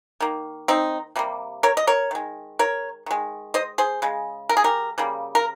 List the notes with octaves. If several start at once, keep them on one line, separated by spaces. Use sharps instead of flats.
D#3 A#3
C4 D#4
C3 G3 A#3
A#4 C#5
D#5
A#4 C#5
D#3 G#3
A#4 C#5
D#3 G#3
C5 D#5
G#4 C5
C#3 G#3
A#4
G#4
G4 A#4
C#3 G3 A#3
A#4